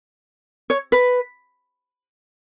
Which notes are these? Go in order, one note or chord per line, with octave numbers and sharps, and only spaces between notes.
C#5
B4